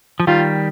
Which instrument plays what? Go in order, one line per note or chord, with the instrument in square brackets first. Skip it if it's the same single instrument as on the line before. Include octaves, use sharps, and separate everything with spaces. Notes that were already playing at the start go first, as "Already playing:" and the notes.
[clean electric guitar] F3
[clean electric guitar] D#3 G3 [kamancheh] F4